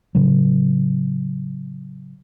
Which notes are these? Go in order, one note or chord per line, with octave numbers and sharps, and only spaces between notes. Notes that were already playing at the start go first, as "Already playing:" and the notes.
A2 C#3 F#3